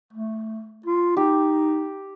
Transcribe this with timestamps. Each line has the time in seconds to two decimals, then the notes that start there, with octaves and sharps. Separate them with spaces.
0.13 A3
0.86 F4
1.17 D#4 G4